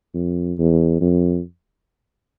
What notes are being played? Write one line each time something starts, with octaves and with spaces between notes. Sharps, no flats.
F2
E2
F2